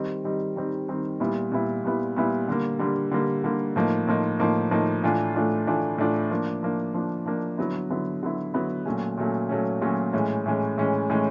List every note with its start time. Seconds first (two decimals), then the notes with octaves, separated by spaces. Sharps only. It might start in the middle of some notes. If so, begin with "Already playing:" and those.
Already playing: D#3 G3 C4 D#4
0.24 D#3 G3 C4 D#4
0.56 D#3 G3 C4 D#4
0.88 D#3 G3 C4 D#4
1.20 A#2 G3 B3 E4
1.52 A#2 G3 B3 E4
1.84 A#2 G3 B3 E4
2.16 A#2 G3 B3 E4
2.48 D3 G3 A#3
2.79 D3 G3 A#3
3.11 D3 G3 A#3
3.44 D3 G3 A#3
3.76 A2 F3 A#3 D#4
4.07 A2 F3 A#3 D#4
4.39 A2 F3 A#3 D#4
4.71 A2 F3 A#3 D#4
5.03 A2 E3 A3 D4 F4
5.34 A2 E3 A3 D4 F4
5.67 A2 E3 A3 D4 F4
5.98 A2 E3 A3 D4 F4
6.31 F3 A#3 D4
6.63 F3 A#3 D4
6.94 F3 A#3 D4
7.26 F3 A#3 D4
7.58 D3 F#3 B3 E4
7.90 D3 F#3 B3 E4
8.23 D3 F#3 B3 E4
8.54 D3 F#3 B3 E4
8.86 A#2 F#3 A3 C#4
9.18 A#2 F#3 A3 C#4
9.49 A#2 F#3 A3 C#4
9.81 A#2 F#3 A3 C#4
10.13 A2 E3 G#3 C#4
10.46 A2 E3 G#3 C#4
10.77 A2 E3 G#3 C#4
11.10 A2 E3 G#3 C#4